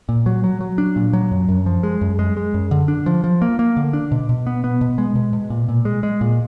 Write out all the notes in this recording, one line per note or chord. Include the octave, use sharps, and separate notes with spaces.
A#2
F#3
F#3
F#3
D4
A#2
F#3
F#2
F#2
F3
G#3
F#2
G#3
G#3
F#2
D3
D4
F3
F3
A#3
A#3
D3
D4
B2
B2
B3
B3
B2
G#3
B2
B2
A#2
A#2
G#3
G#3
A#2